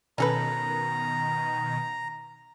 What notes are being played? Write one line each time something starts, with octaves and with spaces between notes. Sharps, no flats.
B2 D#3 C#4 A4 B4 A#5